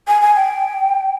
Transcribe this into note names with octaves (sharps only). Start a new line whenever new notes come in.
G#5
G#5
G5